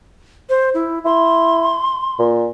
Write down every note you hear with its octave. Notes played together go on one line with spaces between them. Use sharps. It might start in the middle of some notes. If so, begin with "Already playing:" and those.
C5
E4
E4 C6
A#2